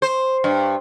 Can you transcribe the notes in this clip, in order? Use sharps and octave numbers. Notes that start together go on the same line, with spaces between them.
C5
G2